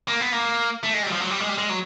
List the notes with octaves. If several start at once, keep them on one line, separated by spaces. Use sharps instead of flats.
A#3
B3
A#3
A3
G#3
G3
F#3
F3
F#3
G3
G#3
G3
G#3
F#3